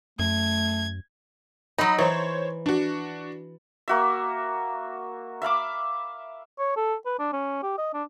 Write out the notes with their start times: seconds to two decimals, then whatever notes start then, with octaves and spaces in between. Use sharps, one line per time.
0.19 F#2 A3 G#6
1.78 F#3 D#4 D#5 B5
1.99 E3 C5 C#5
2.66 D4 F#4
3.88 A#3 F#4 E5
5.42 E5 F5 B5 D6
6.59 C#5
6.76 A4
7.06 B4
7.19 D4
7.33 C#4
7.63 G4
7.78 D#5
7.94 D4